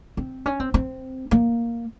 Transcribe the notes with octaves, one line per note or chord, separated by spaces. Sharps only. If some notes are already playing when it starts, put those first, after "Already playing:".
C4
C#4
C4
C4
A#3